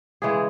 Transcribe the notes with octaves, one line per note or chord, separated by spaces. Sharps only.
C#3 E3 G#3 G#4